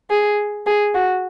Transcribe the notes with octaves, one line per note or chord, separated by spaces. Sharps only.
G#4
G#4
F#4